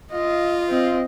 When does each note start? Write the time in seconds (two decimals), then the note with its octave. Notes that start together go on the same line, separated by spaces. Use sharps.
0.12 F4 D#5
0.69 C4 D#5